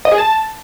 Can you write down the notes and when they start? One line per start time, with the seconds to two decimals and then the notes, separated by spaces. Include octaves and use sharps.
0.05 D#5
0.12 G#4
0.18 A5